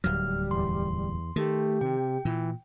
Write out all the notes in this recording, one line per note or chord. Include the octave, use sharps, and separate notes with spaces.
D1 D#2 F#3 G3 F6
E2 C6
D#3 A3 G4
C3 G5
A#2 E3